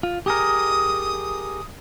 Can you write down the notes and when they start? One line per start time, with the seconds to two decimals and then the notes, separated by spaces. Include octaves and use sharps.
0.03 F4
0.26 G4 G#4 A#4 D#6